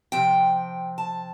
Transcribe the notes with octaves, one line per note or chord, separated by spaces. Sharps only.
C3 F3 C4 G5
A5